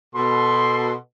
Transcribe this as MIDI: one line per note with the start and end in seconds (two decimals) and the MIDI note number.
0.16 0.94 47
0.16 0.94 69
0.16 0.94 84